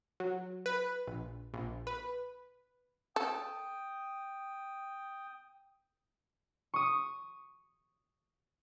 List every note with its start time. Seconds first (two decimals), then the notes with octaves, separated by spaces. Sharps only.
0.20 F#3
0.66 B4
1.08 A#1
1.54 A#1
1.87 B4
3.16 A4 G5 D#6
6.74 C#6 D#6